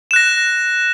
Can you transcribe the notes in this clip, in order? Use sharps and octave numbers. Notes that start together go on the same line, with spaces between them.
F#6 A#6 E7